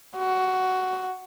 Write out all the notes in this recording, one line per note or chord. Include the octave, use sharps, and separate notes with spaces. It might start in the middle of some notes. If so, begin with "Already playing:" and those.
F#4